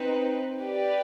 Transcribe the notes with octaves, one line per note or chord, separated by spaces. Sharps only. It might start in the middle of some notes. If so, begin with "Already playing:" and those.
Already playing: C4 D#4 B4
G4 B4 D5